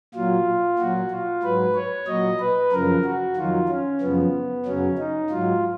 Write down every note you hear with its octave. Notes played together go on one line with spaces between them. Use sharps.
A#2 F#3 F4
A#2 F#3 F#4
F4
G#2 F#3 B4
C#5
A#2 F#3 D#5
B4
F#2 C#3 F3 A#4
F#4
F2 D#3 F#3 F4
C#4
F#2 C#3 F3 B3
F#2 C#3 F#3 C#4
D#4
G#2 F#3 F4